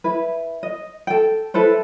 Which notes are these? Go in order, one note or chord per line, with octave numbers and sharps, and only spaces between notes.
E4 B4
D#5
A4 G5
E4 A4 B4 C5